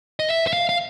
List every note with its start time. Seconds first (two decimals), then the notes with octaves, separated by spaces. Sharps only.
0.19 D#5
0.29 E5
0.47 E5
0.53 F5
0.69 F5